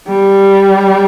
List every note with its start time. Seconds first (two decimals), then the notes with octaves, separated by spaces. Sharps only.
0.08 G3